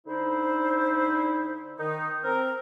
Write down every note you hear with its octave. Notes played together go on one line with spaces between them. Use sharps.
D3 D#4 E4 C5
D#3 D#4
C4 A#4